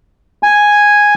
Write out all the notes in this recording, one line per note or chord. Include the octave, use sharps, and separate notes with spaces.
G#5